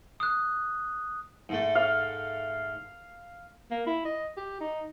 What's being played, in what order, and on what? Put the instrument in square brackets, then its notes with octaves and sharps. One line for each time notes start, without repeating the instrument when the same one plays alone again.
[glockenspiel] D#6 F#6
[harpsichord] G#2 A3
[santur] F5
[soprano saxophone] A#3
E4
D#5
G4
D#4